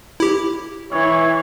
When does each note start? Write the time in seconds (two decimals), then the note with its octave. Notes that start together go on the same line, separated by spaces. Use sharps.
0.20 E4 G4
0.92 E3 C#5